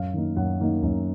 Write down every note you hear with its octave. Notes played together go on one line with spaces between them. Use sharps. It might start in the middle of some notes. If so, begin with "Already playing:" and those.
Already playing: F#2 F5
D#3 A#3 D#4
F#2 F#5
D#3 A#3 D#4
F#2